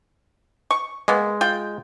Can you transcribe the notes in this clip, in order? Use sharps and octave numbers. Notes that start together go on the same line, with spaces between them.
C#6
G#3 A#3 B3
F4 G5